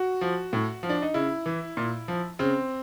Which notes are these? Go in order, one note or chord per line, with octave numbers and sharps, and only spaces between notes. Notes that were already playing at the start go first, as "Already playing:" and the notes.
Already playing: F#4
F3
A2
F3
D4
D#4
C#3 E4
E3
A#2
F3
C#3 C4